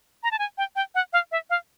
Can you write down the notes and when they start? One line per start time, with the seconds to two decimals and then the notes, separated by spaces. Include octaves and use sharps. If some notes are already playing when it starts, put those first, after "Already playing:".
0.23 A#5
0.31 A5
0.39 G#5
0.58 G5
0.76 G5
0.95 F#5
1.13 F5
1.32 E5
1.50 F5